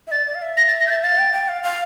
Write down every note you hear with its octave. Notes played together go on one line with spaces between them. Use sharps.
E5
D5 A6
D5
F5
E5
A#6
A6
A#6
G6
A6
F5 A6
G5
G5
F5
F5